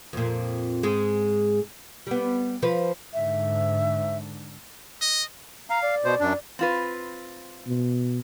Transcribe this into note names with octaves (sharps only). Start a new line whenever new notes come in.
F2 A#2
G#2 G#3
G3 B3
F3 B4
G#2 D3 E5
D#5
F5 A#5
D5
B2 C5
F#2 D4
C4 F4 B4
B2